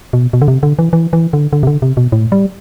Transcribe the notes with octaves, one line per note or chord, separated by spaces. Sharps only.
B2
B2
D3
C3
D3
E3
E3
E3
D3
D3
C3
D3
C3
B2
A2
G3